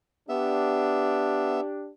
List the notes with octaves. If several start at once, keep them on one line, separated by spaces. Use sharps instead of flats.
B3 D4 G4 E5